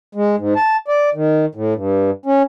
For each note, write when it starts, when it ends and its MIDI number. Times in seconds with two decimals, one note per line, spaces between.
0.15 0.36 56
0.38 0.54 44
0.56 0.77 81
0.88 1.10 74
1.15 1.46 51
1.55 1.74 45
1.74 2.10 43
2.26 2.43 61